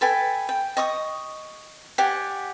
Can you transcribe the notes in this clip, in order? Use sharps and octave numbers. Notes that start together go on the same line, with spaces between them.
A4 B4 G5 G#5
G5
D#5 C#6 D#6
G4 D5 F#5 G#5